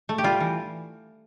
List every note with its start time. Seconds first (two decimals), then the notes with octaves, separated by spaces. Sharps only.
0.09 A3
0.18 G4
0.24 G3 F4
0.40 E3